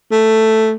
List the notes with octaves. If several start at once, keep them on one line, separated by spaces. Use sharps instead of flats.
A3